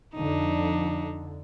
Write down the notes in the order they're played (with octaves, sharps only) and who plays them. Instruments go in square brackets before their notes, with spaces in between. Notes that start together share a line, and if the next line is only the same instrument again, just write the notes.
[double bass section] F2 D3 [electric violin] D4 D#4